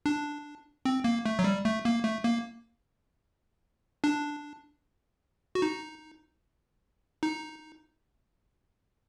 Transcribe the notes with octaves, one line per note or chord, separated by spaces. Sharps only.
D4
C4
A#3
A3
F#3
G3
A3
A#3
A3
A#3
D4
F#4
D#4
D#4